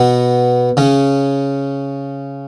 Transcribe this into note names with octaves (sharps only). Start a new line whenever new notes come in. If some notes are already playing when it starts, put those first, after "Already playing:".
Already playing: B2 B3
C#3 C#4